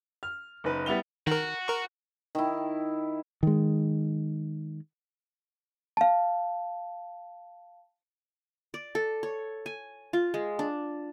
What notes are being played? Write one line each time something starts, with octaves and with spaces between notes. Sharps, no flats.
F6
F#1 D#4 B4
G3 B3 E4 F7 G7
D#3 F#4 A#4
A#4 C#6
D#3 E4
D#3 G#3
F5 A5
D5
A4
C#5
G#5
F4
G#3
D4